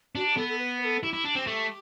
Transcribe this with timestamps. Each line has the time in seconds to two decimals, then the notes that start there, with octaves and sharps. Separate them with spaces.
0.15 D4 F#4
0.26 G4
0.37 B3 A4
0.48 A4
0.59 B4
0.81 B4
0.85 A4
1.03 E4 G4
1.13 E4
1.25 D4
1.35 C4
1.47 A3